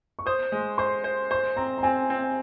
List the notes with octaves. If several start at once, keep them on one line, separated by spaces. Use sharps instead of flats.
C#6
C5 D#6
G#3
C5 C6
C5
C5 C6
C4 A#5
A#5
C4 G#5
C4